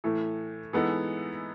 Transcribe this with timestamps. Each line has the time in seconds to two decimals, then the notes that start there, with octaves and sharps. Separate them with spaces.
0.04 A2 E3 A3
0.73 E3 G#3 B3 D#4 A4